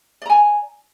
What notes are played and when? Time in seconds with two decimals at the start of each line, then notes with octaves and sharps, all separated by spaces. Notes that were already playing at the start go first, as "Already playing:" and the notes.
0.22 D5
0.26 A#5
0.30 G#5